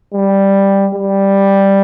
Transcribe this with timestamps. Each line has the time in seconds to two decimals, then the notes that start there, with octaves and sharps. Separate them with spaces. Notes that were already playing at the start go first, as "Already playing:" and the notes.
0.14 G3
0.94 G3